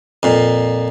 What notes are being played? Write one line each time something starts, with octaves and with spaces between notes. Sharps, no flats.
F2 A#2